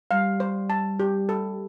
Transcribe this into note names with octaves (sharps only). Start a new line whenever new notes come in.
G3 F5
C5
A5
G4
A4